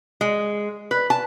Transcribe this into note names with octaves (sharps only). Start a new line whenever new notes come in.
G#3
B4
A5